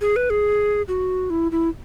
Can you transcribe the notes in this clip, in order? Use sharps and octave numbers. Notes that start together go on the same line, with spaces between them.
G#4
B4
G#4
F#4
E4
E4